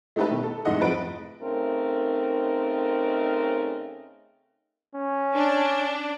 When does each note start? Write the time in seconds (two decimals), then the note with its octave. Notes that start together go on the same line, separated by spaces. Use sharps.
0.16 G#3 A3 D#4 G4 A4 B4
0.31 B2 D#3
0.43 A4
0.65 F1 G#2 E3 D#5 F#5
0.81 F2 F3 B4 D7
1.42 C#3 A3 C4 D#4 A#4
4.95 C#4
5.35 D4